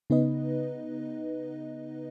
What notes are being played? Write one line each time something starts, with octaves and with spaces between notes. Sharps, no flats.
C#3 B3 D#4 B4 D#5